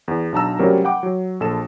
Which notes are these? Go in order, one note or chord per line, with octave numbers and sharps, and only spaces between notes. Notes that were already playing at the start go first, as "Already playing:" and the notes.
E2
B1 D4 A5 A#5 E6
C3 F#3 G3 A3 C#4 A#4
F#5 G5 B5 D6
F#3
A#1 A4 A5 E7